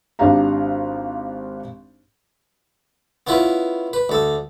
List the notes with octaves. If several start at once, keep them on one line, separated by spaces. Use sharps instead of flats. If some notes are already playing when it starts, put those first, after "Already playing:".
G#1 D4 G4 F5 A#5
B3 C#4 E4 F4 B4
B4
D2 A4